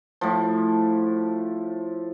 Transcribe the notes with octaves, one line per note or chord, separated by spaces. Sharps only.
A2 F3